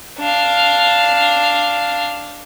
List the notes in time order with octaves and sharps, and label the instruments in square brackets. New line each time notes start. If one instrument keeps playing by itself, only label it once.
[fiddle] D4 F5